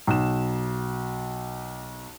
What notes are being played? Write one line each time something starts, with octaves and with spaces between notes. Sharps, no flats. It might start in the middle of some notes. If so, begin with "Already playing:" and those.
B1 E7